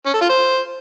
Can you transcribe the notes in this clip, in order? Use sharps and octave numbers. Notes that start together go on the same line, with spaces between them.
C#4
A4
F4
C5